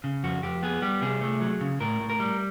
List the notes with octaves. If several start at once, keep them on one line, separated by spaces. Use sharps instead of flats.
C#3
F2 F#4
F2 G4
B3 G#4
G3 G4
C3 G#4
A3
F#3
C#3
A2 A#4
A2
A#4
G3